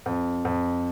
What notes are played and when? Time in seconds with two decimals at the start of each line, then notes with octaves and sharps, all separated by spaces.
0.06 F2
0.45 F2